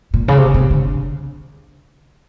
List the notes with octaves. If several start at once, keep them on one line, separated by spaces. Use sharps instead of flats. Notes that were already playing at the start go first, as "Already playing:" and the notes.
A#2
C#3
C3
C3
D3